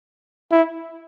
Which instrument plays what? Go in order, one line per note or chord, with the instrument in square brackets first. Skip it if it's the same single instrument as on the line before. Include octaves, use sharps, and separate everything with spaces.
[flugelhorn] E4